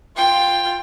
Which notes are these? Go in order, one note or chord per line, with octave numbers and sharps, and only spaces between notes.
F4 G5